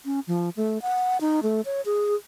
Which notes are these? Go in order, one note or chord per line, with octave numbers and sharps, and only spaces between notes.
C#4
F3
A3
F#5
D#4
A3
C#5
G#4